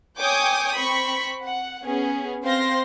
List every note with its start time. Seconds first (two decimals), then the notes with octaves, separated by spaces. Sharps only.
0.19 C#5 G5 G#5 D6 D#6 G6
0.77 C4 B5 C#6 B6
1.43 F#5
1.85 B3 C#4 G#4
2.43 C4 C5 F5 C6 A#6